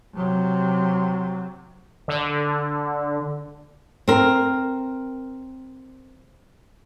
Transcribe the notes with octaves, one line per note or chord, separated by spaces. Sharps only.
C3 F#3
D3
C4 A#4